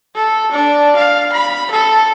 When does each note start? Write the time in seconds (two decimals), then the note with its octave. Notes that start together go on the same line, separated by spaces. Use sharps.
0.15 A4
0.52 D4
0.96 F5
1.33 B5
1.71 A4